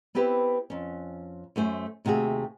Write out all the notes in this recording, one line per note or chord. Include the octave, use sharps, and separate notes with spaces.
B3 C4 E4 G4 B4
F2 C#4
F#2 A3 C5 G#5
D#2 C3 A3 F#4 G#4